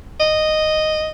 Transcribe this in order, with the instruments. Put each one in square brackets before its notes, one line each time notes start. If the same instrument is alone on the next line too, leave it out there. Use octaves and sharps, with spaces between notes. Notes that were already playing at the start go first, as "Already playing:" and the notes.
[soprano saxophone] D#5